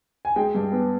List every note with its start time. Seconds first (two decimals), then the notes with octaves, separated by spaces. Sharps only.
0.25 G#5
0.36 G#3 G5
0.55 G2
0.72 B3